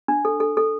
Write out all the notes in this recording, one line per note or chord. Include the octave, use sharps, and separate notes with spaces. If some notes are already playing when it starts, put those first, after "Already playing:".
D4
A4
A4
A4